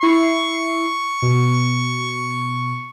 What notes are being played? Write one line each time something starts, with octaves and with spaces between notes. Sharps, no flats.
E4 C#6 C7
B2